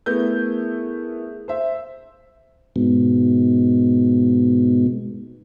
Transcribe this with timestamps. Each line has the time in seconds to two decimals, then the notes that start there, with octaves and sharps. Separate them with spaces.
0.06 A3 B3 E4 G#4 A#4 G6
1.48 C5 E5
2.76 G#2 B2